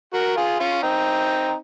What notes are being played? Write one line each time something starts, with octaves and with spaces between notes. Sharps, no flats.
F#4 A#4
F4 G#4
C#4 F4
C4 D#4